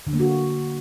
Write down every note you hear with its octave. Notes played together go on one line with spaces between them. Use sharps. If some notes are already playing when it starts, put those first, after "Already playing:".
D3
A#3
F#4